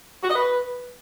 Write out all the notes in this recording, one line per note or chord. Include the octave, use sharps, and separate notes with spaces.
F#4
D#5
B4